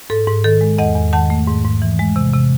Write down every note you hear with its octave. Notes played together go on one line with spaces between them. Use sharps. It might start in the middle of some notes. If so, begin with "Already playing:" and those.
G#2 A4
G#2
D#3 A4
G#3
E2 D#5 F#5
E2
D#3 F#5 A5
A3
G#2
G#2
E3
G#3
C3
C3